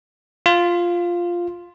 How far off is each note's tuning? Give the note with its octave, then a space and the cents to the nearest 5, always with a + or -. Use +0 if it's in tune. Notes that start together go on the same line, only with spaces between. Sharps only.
F4 +0